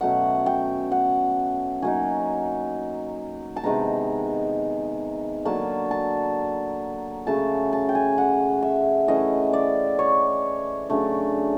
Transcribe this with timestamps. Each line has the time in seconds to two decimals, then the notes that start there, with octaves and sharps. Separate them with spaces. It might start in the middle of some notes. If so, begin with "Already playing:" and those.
0.01 B2 F#3 A3 C#4 F#5
0.46 G5
0.92 F#5
1.82 F#3 A#3 D#4 G#5
3.56 A5
3.63 C3 D#3 G#3 B3 A#5
5.45 D3 F#3 A#3 D4 A5
5.91 A5
7.27 C#3 F#3 A3 A5
7.73 A5
7.89 G5
7.95 G#5
8.18 F#5
8.62 E5
9.08 E3 A3 C#4 D#5
9.53 D5
9.99 C#5
10.90 C#3 F#3 A3 D4